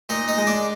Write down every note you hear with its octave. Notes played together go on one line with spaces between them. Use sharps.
A#2 D#4 D#5
D#4 D#5
G#3
D4 D5